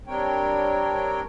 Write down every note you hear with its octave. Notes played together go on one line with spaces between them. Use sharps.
G3 C4 D4 A#4 C#5 G5